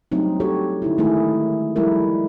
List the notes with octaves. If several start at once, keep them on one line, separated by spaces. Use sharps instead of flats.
F#3 G3 A3 C4 D4 D#4
F#4 G4 A4 C#5
D3 D#4 E4
D#3 G#3 A3 D#4 E4 G#4
F3 G3 G#3 E4 A4 A#4